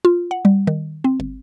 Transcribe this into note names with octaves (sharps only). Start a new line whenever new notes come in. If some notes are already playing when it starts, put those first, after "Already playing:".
F4
F#5
G3
D#3
C4
G1